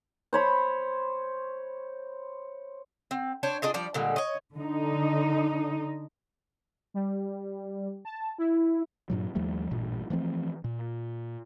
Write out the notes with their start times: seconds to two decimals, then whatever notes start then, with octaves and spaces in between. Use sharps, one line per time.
0.33 C5 C#5 B5
3.11 C4
3.43 D4 C5 C#5
3.62 D4 F4 G#4 D#5
3.74 F3 G3 D5
3.94 A#2 D3 G3 G#3
4.16 C#5 D#5
4.56 D3 D#4
6.94 G3
8.05 A5
8.38 E4
9.10 G2 A#2 F#3
9.35 D#2 F3 G3 A3
9.71 A1 G2 A#2
10.10 E3 F3 A3 C4
10.64 A#2